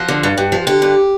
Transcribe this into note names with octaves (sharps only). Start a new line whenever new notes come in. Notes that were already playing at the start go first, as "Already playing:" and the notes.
Already playing: F3 F#4
D3
G2
G2
F3
D3 G4
G2